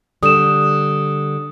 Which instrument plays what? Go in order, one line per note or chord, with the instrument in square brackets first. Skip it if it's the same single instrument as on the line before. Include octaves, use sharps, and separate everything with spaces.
[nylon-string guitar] D3 G3 [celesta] D#6 E7